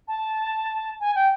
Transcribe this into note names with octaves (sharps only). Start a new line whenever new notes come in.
A5
G#5
G5